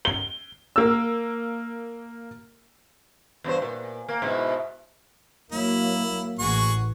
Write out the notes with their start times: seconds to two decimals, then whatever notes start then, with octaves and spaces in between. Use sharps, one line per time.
0.05 G7
0.76 A#3 E6
3.44 E2 G2 C5
3.62 A#2
4.09 A#3
4.22 G#2 B2 E4
5.52 F#3 A#3 E4
6.39 A1 F#4 G#4 C#6